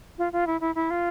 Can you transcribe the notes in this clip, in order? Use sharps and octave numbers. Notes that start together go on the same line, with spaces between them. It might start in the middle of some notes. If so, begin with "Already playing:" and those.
F4
F4
E4
E4
E4
F4